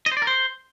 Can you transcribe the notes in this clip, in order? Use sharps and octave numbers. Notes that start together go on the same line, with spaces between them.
D#5
C5
D5
A#4
C5